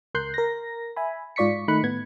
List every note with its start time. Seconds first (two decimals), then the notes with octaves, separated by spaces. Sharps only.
0.14 C#2 A#4 C6 F#6 G6 C7
0.34 A#4 A#6
0.96 E5 G#5 B5
1.36 G#2 F4 D5 C#6 B6 C#7
1.68 D#3 A3 D#4 B5 F#6 C#7
1.83 A2 B3 G#6